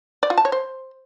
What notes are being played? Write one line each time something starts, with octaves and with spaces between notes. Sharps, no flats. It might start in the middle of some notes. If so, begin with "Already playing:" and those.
D5
F4
A5
C#5
C5